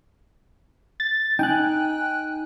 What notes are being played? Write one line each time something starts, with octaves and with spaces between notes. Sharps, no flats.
A6
D#4 G5 G#5 F#6